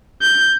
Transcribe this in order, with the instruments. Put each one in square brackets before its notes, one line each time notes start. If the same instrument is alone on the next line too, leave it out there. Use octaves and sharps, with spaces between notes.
[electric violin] G6